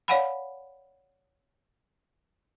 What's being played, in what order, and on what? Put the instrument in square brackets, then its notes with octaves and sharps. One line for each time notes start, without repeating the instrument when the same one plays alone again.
[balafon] C#5 D5 F5 F#5 G#5 B5